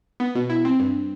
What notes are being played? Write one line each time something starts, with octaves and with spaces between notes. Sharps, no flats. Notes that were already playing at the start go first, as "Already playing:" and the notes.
B3
B2
E4
C4
G2